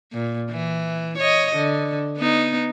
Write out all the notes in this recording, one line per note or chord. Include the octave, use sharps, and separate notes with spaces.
A#2
E3
C#5 D#5
D3
B3 D#4